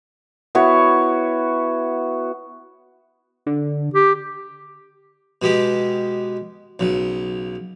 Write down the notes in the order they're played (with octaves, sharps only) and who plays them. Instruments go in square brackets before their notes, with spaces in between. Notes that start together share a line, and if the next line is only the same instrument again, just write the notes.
[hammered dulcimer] B3 E4 F#4 C#5
[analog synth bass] D3
[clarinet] G4
[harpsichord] B2 G#3 G4
B1 C#3